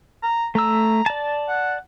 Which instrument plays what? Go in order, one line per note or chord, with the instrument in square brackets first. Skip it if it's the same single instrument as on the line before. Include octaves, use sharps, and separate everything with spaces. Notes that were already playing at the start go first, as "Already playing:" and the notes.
[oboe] A#5
[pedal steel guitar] A3 E6 [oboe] A#5
[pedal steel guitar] D5 A5
[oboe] F#5